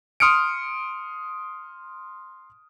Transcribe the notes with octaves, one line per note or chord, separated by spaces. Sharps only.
C6 D#6 F6 C#7 D7